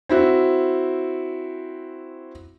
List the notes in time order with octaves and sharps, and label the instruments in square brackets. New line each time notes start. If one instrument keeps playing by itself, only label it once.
[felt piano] C4 E4 F#4